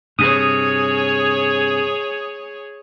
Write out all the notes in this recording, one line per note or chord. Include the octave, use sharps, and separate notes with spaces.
G2 C3 G#4 C#5 D#6